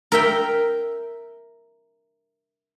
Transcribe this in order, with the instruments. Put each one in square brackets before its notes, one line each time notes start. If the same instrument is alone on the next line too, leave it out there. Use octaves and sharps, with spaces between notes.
[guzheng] A#4 E5 G5